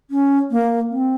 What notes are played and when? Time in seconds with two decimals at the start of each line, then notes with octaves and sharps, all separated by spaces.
0.10 C#4
0.51 A#3
0.90 C4